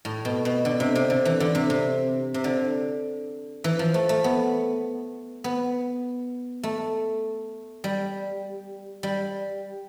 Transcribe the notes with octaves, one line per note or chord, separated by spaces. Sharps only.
A2
B2
B2
D3
C3
C3
D3
E3
D3
C3
C3
C3
D3
E3
F3
A3
A3
B3
B3
A3
G3
G3